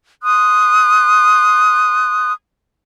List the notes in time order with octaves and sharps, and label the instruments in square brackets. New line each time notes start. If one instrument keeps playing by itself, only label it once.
[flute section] C6 D#6 F#6